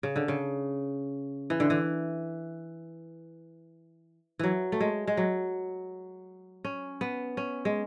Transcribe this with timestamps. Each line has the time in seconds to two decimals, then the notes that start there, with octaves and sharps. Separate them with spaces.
0.03 C#3
0.16 D3
0.28 C#3
1.50 E3
1.60 D3
1.70 E3
4.39 E3 F#3
4.72 A3
4.80 G#3
5.07 G#3
5.17 F#3
6.64 C#4
7.01 B3
7.37 C#4
7.65 G#3